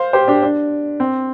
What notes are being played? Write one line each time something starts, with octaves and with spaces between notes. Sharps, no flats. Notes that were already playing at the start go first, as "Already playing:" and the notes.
Already playing: C5 F5
G4 C5
D4 G4
D4
C4